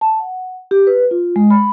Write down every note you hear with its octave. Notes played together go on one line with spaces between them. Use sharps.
A5
F#5
G4
B4
F4
G#3
B5